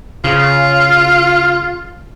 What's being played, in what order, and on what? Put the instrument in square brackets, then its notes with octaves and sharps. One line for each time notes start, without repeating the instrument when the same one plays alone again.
[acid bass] C#3 [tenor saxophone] F4